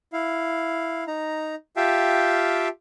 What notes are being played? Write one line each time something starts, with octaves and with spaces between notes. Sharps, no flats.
E4 F5
D#4 A#5
F4 G4 E5 F5 G5 A5